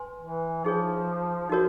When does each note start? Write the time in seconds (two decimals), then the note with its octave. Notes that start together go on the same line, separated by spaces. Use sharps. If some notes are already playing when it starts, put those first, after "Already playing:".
Already playing: B4 G#5 C6
0.21 E3
0.64 F3 D#4 G#4 C#5
1.50 F3 D#4 F#4 A#4 C#5